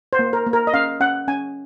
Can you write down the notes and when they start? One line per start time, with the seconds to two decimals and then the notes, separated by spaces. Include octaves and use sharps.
0.13 C5
0.19 A#3
0.33 A#4
0.46 A#3
0.53 A#4
0.67 D#5
0.74 C#4 F5
1.00 C#4 F#5
1.28 C#4 G#5